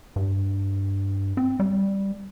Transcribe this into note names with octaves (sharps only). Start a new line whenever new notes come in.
G2
C4
G3